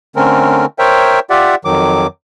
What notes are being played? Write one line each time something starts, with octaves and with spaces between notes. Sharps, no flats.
D3 A3 C4 C#4 A#4
A#4 C5 C#5 E5 G5
F4 G4 D5 E5 F#5
F2 D#3 F#3 D6